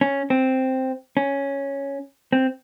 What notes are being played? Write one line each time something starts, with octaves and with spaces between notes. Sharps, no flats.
C#4
C4
C#4
C4